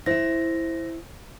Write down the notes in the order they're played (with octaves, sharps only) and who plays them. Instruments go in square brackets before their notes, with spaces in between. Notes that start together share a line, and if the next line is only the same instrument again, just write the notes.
[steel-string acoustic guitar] E4 E5 [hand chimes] C5 A#6